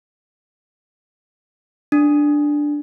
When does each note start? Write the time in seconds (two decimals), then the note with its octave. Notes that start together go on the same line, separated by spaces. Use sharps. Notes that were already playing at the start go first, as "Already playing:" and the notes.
1.92 D4